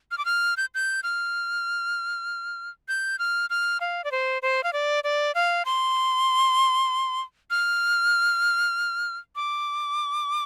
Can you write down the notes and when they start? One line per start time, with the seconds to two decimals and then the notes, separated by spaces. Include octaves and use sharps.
0.11 F6
0.18 D6
0.25 F6
0.57 G6
0.75 G6
1.03 F6
2.88 G6
3.19 F6
3.50 F6
3.81 F5
4.04 D5
4.12 C5
4.42 C5
4.64 F5
4.73 D5
5.04 D5
5.35 F5
5.65 C6
7.50 F6
9.36 D6